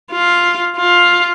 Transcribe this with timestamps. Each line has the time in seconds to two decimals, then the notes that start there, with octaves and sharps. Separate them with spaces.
0.11 F4
0.77 F4